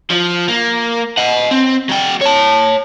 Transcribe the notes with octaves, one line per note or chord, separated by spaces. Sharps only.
F3
A#3
D#5 F#5
C4
F#3 G5
C#5 A5